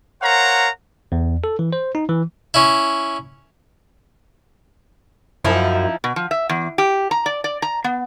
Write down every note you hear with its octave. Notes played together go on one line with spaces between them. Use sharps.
A#4 C5 C#5 F5 F#5 A#5
E2
A4
E3
C5
D#4
E3
C#4 E4
F#2 F3 D#4 E4
B2
F3
E5
E2
G4
A#5
D5
D5
A#5
B3